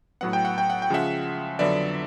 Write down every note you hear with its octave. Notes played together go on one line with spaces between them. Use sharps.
A2 F#3 B3 F#5
G5
F#5
G5
F#5
G5
C#3 F3 G#3 E5 F#5
F2 D3 F#3 B3 D5 E5